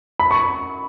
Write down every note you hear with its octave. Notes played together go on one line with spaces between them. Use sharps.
B5
C#6